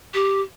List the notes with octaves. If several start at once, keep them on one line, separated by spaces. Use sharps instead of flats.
G4